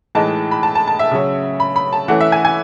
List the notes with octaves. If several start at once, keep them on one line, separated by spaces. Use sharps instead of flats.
A2 E3 G#3 D#4 A5
B5
A5
A5
A5
E5
C#3 F#3 C#4
B5
B5
A5
E3 A3 C#4 F#5
E5
G#5
G#5